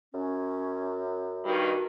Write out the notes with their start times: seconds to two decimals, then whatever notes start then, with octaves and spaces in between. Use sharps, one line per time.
0.14 F#2 C#4
1.45 G2 D#3 F#4